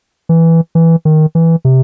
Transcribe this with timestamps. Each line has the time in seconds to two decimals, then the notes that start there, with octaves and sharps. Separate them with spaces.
0.29 E3
0.75 E3
1.05 D#3
1.35 E3
1.65 C3